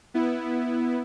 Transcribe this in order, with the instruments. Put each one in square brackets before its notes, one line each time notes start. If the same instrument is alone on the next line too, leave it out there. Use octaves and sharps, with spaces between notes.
[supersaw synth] B3 E4